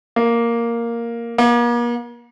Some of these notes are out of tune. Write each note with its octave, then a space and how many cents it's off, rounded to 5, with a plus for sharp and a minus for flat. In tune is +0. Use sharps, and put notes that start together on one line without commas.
A#3 +0
A#3 +40